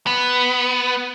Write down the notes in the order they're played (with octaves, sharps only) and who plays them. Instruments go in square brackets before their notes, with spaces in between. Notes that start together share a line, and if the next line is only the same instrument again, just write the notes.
[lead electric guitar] B3